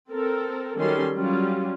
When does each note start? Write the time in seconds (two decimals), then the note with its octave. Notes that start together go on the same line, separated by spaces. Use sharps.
0.11 C4 A4 A#4
0.77 D#3 F#3 G3 C#4 A4 C6
1.16 F#3 G3 C#4 F4